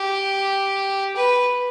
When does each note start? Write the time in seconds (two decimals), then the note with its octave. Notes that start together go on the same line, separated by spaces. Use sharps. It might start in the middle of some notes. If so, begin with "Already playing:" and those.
Already playing: G4
1.16 B4